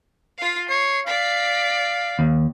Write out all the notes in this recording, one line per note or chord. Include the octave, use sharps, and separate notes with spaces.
F4 F5
C#5 C7
D5 F5 B6
D#2